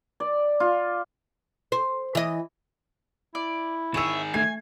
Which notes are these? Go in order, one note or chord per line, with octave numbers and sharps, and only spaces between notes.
D5
F4
C5
E3 D#5
E4 D5
D#3 G#4 C#5 E5 E7 F7
A3 G#5 G#6 C7